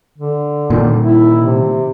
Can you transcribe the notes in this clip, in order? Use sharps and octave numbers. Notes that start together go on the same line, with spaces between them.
D3
A#2 D#3
E4
C3